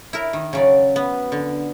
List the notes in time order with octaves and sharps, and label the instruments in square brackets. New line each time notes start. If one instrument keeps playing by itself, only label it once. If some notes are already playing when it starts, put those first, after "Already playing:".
[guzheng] E4 A#4
D#3
C#3 F#3 D5
B3
D3